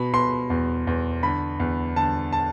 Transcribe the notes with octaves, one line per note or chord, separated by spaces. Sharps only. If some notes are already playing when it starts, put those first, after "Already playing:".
Already playing: B2 B5
B2 C6
E2
E2
D3 B5
E2
D3 A5
A5